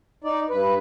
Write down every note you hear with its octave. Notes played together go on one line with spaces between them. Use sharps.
D#4 D5
G2 B4